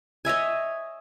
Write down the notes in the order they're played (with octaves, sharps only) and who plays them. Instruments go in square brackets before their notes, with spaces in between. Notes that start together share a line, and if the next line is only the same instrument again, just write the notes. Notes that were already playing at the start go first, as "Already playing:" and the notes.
[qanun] C#5 D#5 E5 G#5